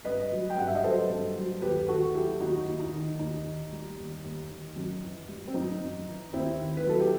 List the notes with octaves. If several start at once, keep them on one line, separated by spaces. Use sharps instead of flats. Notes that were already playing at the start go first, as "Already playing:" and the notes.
G2 B4 D#5
F#3
G5
G2 F#5
E5
D#5
F#3 A4 C5
G2
F#3
D#2 G4 B4
D#3 F#4 A4
F#3 E4 G4
D#2 D#4 F#4
D#2
E4
D#4
D#3
D#2 D#4
D#3
G3
D#2
D#2
D#3
F#2
E3
G3
C4
F#2 D#4
F#2
E3
D#2 C4 E4
D#3
B4
F#3 A4
G4